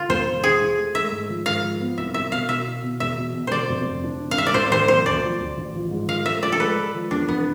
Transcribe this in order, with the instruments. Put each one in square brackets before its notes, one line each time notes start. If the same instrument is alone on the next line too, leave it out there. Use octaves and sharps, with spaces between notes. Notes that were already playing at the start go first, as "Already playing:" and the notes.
Already playing: [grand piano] D3 [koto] F4
[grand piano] E1 [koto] C5
[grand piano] E1
[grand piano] E4 [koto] G#4
[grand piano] E4
A3
[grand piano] G#3 [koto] E5
[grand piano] G#2
F3
[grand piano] G#2 [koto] F5
[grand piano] F3
B3
[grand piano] C2 [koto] E5
[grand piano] B3 [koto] E5
[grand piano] B2 [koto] F5
[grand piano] B2 [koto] E5
[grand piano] E4
B2
[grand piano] E2 [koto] E5
[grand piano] B2
B2
[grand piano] D3 [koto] C5 D5
[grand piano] F1
F1
D4
C3
[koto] F5
[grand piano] C2 [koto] E5
[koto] D5
[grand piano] A2 [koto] C5
[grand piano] E3 [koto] C5
[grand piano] B1 [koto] C5
[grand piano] D2 [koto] D5
[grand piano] F3
D2
A1
F3
G#2
[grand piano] F3 [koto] F5
[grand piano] A3 [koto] E5
[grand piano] F3 [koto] D5
[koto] A4
[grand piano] G#3 [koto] B4
[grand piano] G#3
F3
[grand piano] E2 [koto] D4
[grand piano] F1 [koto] B3